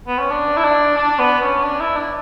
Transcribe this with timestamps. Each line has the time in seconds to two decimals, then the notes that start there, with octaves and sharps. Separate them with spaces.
0.07 B3
0.19 C#4
0.30 D4
0.57 E4
0.64 D4
0.97 D4
1.19 B3
1.42 C#4
1.63 D4
1.81 E4
1.97 D4